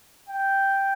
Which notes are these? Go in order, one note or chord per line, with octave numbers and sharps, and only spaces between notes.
G5